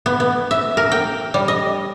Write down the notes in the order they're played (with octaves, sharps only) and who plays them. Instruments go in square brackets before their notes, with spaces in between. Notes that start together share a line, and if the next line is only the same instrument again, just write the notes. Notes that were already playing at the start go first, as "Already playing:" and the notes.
[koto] B3
B3
E5
A#4
G5
G3
D#5